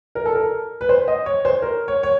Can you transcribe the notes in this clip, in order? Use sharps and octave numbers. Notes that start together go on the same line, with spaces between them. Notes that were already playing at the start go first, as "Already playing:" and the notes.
A#4
A4
A#4
B4
C5
D#5
C#5
C5
A#4
C#5
C#5